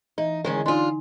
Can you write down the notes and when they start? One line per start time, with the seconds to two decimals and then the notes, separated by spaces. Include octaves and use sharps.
0.18 E3 D#4
0.45 D3 D#3 G#3 C#4
0.66 D4 D#4 F4 G#5 C6